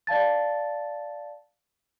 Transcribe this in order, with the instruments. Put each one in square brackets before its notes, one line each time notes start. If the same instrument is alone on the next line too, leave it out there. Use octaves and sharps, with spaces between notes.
[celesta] D5 F5 A5 A6